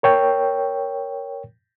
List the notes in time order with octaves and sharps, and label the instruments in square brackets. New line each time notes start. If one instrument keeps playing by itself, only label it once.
[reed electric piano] A#4 C#5 G5